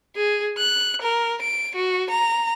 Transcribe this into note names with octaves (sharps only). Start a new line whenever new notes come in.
G#4
F#6
A#4
D7
F#4
A#5